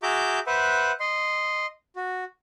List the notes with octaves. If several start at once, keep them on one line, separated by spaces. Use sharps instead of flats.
F#4 G#4 E5 A#5 D6 G6
B4 C5 E5 F#5
D#5 C6
F#4